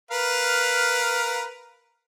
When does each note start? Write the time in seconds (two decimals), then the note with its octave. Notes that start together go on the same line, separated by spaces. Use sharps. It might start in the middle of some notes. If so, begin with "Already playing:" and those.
0.11 A#4 B4 F5